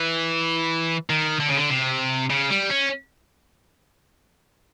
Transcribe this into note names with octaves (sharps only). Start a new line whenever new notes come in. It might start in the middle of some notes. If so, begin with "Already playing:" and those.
Already playing: E3
D#3
D3
C#3
D3
C3
C#3
G3
C#4